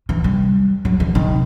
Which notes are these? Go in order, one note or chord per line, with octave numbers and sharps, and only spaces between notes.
E3
G3
F#3
E3
D#3